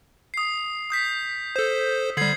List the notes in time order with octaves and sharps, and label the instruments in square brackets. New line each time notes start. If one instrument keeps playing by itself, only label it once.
[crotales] D#6 C7
D#6 G6 B6
[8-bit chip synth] A4 C5
[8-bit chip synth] D3 G3 [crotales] G#6 C7 F#7